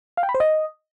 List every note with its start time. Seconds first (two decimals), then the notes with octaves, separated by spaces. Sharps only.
0.17 F5
0.23 G5
0.29 B5
0.35 C5
0.40 D#5